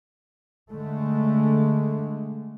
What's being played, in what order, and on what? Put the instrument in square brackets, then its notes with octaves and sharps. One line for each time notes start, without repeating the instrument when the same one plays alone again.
[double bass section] D3 G#3 A3